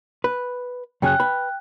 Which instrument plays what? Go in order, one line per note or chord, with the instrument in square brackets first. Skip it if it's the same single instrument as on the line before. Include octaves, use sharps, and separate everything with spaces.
[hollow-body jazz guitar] B4
[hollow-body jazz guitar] F#2 C#3 G#4 [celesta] G5 F6 F#6
[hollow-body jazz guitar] B4 B5